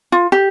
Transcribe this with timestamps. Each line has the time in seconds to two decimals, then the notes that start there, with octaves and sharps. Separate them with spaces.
0.12 F4
0.32 G4